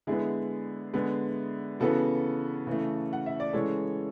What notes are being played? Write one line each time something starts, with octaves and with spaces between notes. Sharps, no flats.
D3 G#3 B3 E4 G#4
D3 G#3 B3
C#3 E3 B3 F#4 A4
C#3 E3 A3
F#5
E5
D5
C#3 E3 G#3 A4 C#5